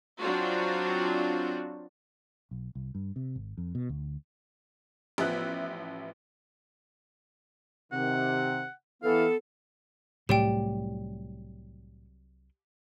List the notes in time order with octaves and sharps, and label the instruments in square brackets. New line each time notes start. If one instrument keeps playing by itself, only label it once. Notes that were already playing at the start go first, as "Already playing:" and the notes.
[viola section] F#3 C4 D4 F4 F#4
[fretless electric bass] B1
C2
G2
C3
G#1
F2
B2
D2
[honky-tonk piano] A1 F3 B3 E5 F#6
[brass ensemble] C3 D#3 [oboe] F#5
[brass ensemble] E3 [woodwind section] B3 A4 [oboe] F5
[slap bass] C2 F#3 G3 [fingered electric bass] A2 [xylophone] G4 D5 G5